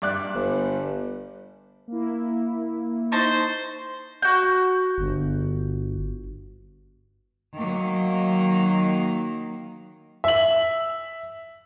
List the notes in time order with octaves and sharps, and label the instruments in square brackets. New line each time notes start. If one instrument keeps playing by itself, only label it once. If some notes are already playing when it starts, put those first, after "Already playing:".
[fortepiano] G2 D5 F#6
[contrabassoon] G1
[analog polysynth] A#3 E4
[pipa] D#4 A5 C#6 [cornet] C5
[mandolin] F#4 G6
[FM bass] G1
[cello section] D#3 F#3 A#3
[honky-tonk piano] E5 F#7